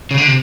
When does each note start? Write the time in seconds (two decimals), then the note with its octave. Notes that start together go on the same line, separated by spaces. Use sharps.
0.11 C#3
0.18 D3
0.27 C3